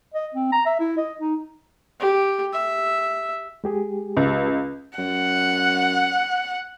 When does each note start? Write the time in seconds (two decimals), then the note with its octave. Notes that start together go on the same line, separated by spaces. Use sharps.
0.14 D#5
0.35 C4
0.52 A#5
0.66 E5
0.80 E4
0.97 D#5
1.20 D#4
2.00 G4
2.53 E5
3.64 G#3 G4 G#4
4.17 C#2
4.98 F#2 F#5